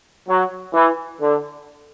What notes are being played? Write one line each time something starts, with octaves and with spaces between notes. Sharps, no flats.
F#3
E3
D3